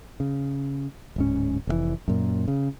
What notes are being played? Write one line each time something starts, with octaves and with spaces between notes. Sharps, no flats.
C#3
D1 G#2 C#4
F1 C3 E3
F#2 A#2
C#3